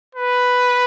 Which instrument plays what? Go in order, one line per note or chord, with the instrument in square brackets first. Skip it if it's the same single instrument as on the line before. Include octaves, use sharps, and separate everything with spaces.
[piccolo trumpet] B4